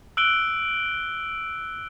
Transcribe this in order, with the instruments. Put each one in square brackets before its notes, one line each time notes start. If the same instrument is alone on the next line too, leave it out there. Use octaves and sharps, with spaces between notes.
[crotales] E6 F#6 D7 G7